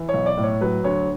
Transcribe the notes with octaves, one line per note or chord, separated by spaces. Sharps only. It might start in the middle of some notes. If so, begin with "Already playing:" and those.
Already playing: E3
C#5
B1
D5
A2
C#5
F#3 B4
D2 C#5